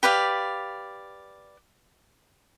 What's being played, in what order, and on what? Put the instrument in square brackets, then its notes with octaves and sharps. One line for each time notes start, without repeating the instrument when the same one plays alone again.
[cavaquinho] G4 B4 D5 F5